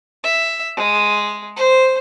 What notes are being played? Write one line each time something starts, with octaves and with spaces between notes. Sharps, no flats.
E5
G#3
C5